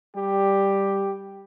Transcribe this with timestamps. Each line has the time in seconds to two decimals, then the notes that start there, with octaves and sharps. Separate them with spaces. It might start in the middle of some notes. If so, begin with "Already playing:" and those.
0.15 G3 G4